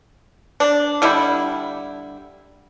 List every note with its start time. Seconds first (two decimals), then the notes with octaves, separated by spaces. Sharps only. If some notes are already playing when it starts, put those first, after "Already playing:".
0.60 D4
1.02 D3 G3 E4